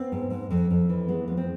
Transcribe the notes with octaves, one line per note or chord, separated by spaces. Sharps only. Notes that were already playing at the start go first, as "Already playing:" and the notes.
Already playing: B3 C4
G#2
G#2
F2
F2
E3
G#3 B3
F2 B3
C4